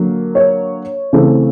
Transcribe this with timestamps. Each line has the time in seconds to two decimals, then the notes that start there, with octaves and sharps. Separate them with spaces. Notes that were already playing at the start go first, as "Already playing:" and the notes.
Already playing: D3 F#3 A#3
0.35 C#5
1.13 C#3 E3 A3 C4